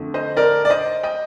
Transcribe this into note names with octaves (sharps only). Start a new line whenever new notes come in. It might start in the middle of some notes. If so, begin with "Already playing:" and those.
Already playing: F2 D3 A3
C5 D#5
A#4 D5
D5
C5 D#5
D#5 G5